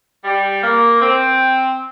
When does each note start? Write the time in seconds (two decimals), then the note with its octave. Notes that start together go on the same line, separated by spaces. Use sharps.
0.24 G3
0.63 A#3
1.01 C4